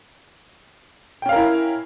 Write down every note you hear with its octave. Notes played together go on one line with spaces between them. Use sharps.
C#4 E4 A#4 F5 G5